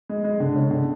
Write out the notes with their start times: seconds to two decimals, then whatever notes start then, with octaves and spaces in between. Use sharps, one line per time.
0.09 G#3
0.24 G#3
0.40 D3
0.56 C#3
0.71 D3